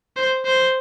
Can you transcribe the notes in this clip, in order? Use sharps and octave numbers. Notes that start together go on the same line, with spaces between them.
C5
C5